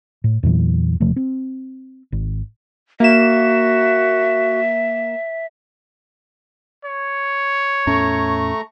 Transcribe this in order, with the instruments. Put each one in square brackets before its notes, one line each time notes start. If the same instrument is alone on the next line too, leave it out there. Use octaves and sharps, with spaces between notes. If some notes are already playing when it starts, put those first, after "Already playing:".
[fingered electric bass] A2
E2 A#2 E3 F#3
E1 C3 F3 A3
C4
G#1
[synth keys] A#3 E7 [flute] F#4 [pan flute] E5
[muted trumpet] C#5
[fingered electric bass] E2 A2 C#4 [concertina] A3 A#5 C#6